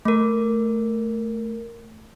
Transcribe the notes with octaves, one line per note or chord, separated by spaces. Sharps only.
A3 A#4